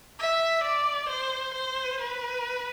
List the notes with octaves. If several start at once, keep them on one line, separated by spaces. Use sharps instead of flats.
E5
D5
C5
C5
B4